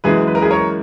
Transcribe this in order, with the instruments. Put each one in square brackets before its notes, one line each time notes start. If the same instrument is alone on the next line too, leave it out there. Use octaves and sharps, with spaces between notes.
[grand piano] F#2 E3 G#3 G#4 B4
B4
A#4
G#4 B4
A#4 C#5